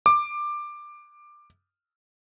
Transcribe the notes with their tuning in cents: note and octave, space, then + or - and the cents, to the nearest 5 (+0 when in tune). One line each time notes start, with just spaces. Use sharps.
D6 +15